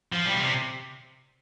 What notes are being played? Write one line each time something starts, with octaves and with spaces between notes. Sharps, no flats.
F3
G3
B2
C3